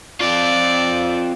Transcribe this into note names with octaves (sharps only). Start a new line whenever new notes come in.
C4 F4 D5